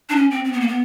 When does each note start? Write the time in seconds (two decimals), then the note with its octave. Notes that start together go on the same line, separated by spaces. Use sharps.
0.09 D4
0.16 C#4
0.31 C4
0.44 C4
0.53 B3
0.61 A#3
0.68 B3